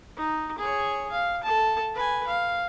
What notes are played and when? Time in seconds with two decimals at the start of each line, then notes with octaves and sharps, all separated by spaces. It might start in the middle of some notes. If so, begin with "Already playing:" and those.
0.17 D#4
0.59 G#4 C#5
1.11 F5
1.43 A4 A5
1.95 B4 G#5
2.27 F5